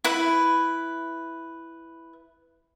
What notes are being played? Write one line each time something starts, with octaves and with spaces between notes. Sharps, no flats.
E4 B4